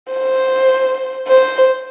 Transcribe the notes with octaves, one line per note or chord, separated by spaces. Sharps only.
C5
C5